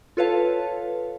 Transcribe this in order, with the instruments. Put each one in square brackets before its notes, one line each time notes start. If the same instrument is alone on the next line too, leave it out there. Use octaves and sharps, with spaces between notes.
[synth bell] F4 A4 B4 C#5 F5 A5